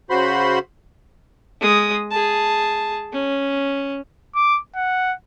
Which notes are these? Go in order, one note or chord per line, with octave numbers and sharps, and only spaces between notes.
C#3 F#4 C5 B5 C6
G#3 D#6
G#4 A5
C#4
D6
F#5